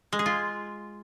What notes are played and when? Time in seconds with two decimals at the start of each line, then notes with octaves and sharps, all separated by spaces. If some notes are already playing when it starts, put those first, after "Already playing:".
0.13 G#3
0.19 G#4
0.26 F4